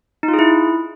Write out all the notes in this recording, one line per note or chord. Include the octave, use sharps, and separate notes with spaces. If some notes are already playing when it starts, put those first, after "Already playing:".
D#4
F4
G#4
E4